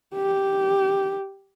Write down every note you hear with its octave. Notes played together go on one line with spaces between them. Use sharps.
G4